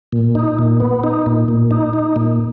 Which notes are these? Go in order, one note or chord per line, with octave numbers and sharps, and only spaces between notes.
A#2
D#4
A#2
B3
D#4
A#2
A#2
D#4
D#4
A#2